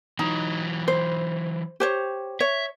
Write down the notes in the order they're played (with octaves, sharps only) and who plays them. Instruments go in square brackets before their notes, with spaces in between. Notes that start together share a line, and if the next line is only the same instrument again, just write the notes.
[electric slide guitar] E3 F#3 [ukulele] D#4
[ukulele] C5
G4 C5 C#5
[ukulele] C#5 [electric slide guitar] E5